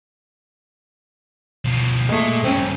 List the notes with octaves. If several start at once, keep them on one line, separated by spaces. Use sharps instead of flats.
B2 F3
A#2 G#3 A3
G2 C#3 C4 C#4